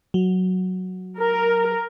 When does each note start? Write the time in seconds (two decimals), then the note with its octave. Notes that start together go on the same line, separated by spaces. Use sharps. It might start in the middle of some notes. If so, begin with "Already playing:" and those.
0.14 F#3
1.18 A#4